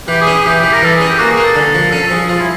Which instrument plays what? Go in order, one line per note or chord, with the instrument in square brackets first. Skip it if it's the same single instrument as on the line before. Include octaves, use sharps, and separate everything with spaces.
[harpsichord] E3 [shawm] G4
[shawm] G#4
[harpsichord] C#4
[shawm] G#4
[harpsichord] E3 [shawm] G4
[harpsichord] E3
[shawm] A#4
[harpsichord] E3 [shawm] A4
[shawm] G#4
[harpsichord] C#4
[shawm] G4
[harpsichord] A#3 [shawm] F#4
[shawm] G#4
[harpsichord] A#3
[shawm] A4
[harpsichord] D3
F3
[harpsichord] C#4 [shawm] A4
[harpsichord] F3 [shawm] G#4
[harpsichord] F3 [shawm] F4
[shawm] E4